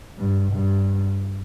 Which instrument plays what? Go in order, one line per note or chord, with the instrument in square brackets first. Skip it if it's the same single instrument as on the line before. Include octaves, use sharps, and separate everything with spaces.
[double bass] G2
G2